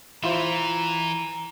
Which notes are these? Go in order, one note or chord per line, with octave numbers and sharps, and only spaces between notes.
E3 E4 F4 C5 A#5